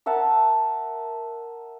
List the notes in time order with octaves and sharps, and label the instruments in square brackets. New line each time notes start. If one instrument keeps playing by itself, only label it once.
[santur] A#4 E5 F#5 A5